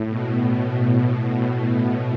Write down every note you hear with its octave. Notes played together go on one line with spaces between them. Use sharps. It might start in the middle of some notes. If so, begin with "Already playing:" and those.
Already playing: A2
B2